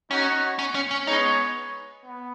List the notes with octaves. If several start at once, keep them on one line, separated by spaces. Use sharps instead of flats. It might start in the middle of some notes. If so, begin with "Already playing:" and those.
C#4 D#4 F#4 C#5 F#5
C#4
C#4
C#4
G#3 B3 D#4 G#4 C#5
B3